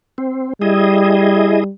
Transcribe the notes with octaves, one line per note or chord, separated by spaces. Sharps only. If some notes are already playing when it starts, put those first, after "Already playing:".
C4
G3 E4 G#4 D#5